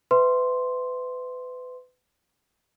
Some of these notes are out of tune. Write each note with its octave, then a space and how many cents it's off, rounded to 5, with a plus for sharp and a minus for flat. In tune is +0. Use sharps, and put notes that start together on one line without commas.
B4 +30 E5 +0 C6 +0